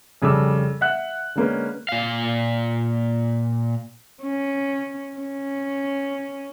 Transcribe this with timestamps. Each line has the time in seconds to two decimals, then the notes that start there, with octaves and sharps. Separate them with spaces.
0.22 F2 C#3 G3 A4 D6 E6
0.81 E5 F#5 F#6
1.35 D3 G#3 A#3 C#4 B4
1.89 A#2 F5
4.23 C#4
5.18 C#4